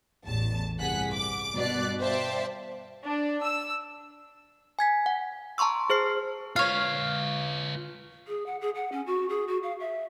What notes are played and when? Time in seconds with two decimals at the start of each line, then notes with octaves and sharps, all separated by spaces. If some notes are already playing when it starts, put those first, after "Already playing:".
0.24 A1 E2 A5
0.79 G1 C2 G#4 F#5 F#6 B6
1.13 D6
1.55 G2 B2 D#3 D5 F#6
2.00 C5 D5 E5 F5 G5 A5
3.05 D4
3.43 E6
4.79 G#5 G#6 B6
5.06 F#5
5.58 A5 A#5 C6 C#6 E6
5.90 G#4 C5 F6 C7
6.56 F4 B4 C#5 F5
8.28 G#4
8.46 F#5
8.61 G#4
8.75 F#5
8.92 C#4
9.06 F#4
9.29 G#4
9.48 F#4
9.63 F5
9.80 E5